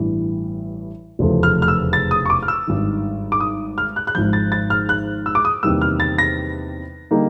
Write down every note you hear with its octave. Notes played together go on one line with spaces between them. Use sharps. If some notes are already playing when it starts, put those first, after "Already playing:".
Already playing: A1 G2 E3
F1 E2 C#3 F3 A3
F6
F6
E6
A6
D#6
C#6
D6
F6
E6
G#1 G2 D#3
D6
D#6
F6
F#6
F#6
G#1 G#2 F3 G6
A6
A6
F6
F#6
E6
D6
D#6
E2 C3 D#3 G3 A#3 E6
F6
A6
A#6
D3 G3 A#3 D#4